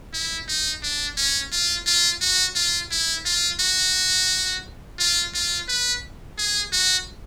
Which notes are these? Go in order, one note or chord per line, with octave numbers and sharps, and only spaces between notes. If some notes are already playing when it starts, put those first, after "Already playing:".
E4
D#4
D4
C#4
F4
F4
F#4
F4
E4
F4
F#4
F4
F4
B4
G#4
F#4